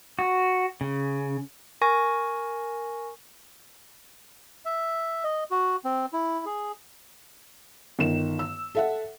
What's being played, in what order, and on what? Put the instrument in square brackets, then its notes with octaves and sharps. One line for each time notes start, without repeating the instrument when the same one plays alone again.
[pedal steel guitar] F#4
C#3
[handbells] A#4 G#5 C#6 A#6
[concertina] E5
D#5
F#4
C4
E4
G#4
[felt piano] G1 D#3 E7
E6
A4 E5 F#5